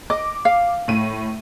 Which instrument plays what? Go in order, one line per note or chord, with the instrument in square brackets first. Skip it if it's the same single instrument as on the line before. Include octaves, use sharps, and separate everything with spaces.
[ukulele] D#5 [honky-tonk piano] D6
[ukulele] F5
[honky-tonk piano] A2 D#7